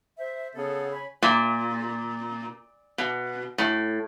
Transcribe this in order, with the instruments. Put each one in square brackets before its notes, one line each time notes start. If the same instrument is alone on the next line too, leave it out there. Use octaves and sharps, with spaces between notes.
[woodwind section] C5 E5
[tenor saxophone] C#3 [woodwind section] B3 A4
[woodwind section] C#5 G#5 B5
[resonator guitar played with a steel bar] A#2
B2
A2